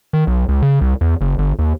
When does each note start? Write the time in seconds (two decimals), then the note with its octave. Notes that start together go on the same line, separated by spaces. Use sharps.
0.13 D#3
0.27 B1
0.48 C#2
0.62 C#3
0.81 C2
1.01 E2
1.21 F#1
1.38 G1
1.59 D#2